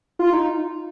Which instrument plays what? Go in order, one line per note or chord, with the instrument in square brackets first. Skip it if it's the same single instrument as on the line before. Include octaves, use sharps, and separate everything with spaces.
[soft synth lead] F4
D#4